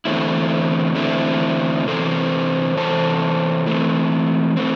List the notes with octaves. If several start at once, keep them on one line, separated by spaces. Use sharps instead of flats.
E2 D3 A3 C4 E4
E2 D3 A3 C4 E4
C3 E3 C4 A4 C5
C3 E3 C4 A4 C5
E3 A3 C4
E3 A3 C4